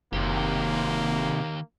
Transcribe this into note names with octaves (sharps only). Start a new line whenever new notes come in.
F#1 D#2 C3 D#3 A#3 G4